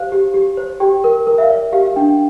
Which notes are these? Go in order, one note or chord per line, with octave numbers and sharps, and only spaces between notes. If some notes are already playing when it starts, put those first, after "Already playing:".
Already playing: G4 C5 F5
G4
G4
C5
G4 G5
A#4
A#4
E5
F5
D5
G4 F5
F5
D4 G5